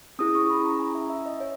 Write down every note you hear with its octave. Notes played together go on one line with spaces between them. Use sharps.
C#4 E4 G#4 D#6
C#6
B5
A#5
G#5
E5
E5
D#5
C#5